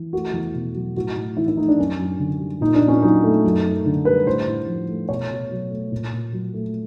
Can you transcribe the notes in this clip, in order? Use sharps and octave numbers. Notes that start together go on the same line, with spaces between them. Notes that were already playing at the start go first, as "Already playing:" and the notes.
Already playing: E3
A3 F#4
E2
B2
F#3
A2 F#4
A2
E3 E4
E4
A3 D#4
D4
F#2 C#4
F#2
D3
G3
A#2 D#4
D4
A#2
C#4
F#3 D#4
A3
F#2
F#2
D3
G3 B4
A2 C5
A2
F3
A3
B2 C#5
B2
F#3
A3
A#2
A#2
F#3
A3